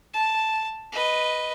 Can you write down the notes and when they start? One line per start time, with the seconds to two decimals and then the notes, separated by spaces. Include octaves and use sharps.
0.14 A5
0.92 B4 D#5